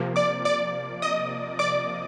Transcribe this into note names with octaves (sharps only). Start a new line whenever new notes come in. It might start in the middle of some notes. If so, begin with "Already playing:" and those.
Already playing: C3 F3 A#3
D5 D6
D5 D6
D#5 D#6
D5 D6